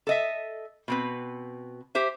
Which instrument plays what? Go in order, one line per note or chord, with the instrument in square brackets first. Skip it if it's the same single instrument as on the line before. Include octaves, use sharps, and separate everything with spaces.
[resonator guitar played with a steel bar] A4 D#5 E5
B2 C4 B4
G4 C5 E5